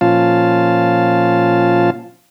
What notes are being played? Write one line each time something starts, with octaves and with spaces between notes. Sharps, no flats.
A#2 F3 C#4 F4 F5 A5